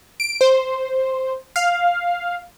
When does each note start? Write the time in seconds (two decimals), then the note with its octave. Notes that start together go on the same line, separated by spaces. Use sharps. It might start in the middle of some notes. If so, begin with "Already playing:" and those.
0.20 D7
0.41 C5
1.56 F5